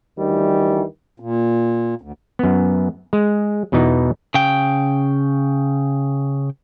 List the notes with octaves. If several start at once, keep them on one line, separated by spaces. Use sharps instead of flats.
D2 D#3 E3 G3
A#2
D2
F#2 B3
G#3
E2 B2 E3 D#4
C#3 G5